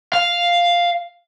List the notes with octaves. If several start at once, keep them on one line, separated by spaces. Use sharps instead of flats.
F5